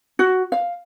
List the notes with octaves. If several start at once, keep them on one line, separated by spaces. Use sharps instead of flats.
F#4
F5